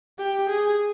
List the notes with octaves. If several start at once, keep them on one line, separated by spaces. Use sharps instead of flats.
G4
G#4